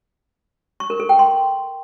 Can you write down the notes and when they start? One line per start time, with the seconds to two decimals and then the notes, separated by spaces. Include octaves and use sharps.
0.80 C#6
0.90 A#4
1.00 A4
1.09 G5
1.19 C6